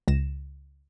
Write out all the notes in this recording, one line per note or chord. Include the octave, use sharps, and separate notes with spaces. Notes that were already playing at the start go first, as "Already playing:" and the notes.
C#2 A#6 E7